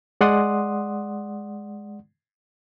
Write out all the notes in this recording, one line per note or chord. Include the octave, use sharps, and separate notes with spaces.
G#3 D5 F#5 C6 D#6